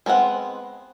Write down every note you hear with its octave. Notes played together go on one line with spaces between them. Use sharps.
G#3 B3 C4 F#5